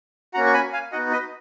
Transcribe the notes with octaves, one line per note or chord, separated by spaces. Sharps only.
A#3 C#4 F#4 F#5 A#5
C#6
G#5 B5
F5 G#5
B3 D#4 F#4 D#5 F#5
B4 D#5